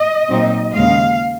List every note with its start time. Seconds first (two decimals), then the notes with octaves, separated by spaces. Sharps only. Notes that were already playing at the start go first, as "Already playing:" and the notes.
Already playing: D#5
0.30 A#2 F#3 C4 D#4
0.75 D#2 C#3 G#3 F5